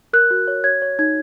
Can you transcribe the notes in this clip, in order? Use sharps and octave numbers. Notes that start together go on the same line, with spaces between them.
A#4 F#6
F#4
C#5
C#5 G#6
C#5
D#4 G#6